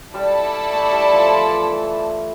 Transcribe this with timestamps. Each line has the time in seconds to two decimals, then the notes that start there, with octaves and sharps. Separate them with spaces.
0.14 G3 E4 A4 D5 A5
0.73 A3
0.92 G3
1.12 F3
1.32 F3
1.51 E3
1.70 E3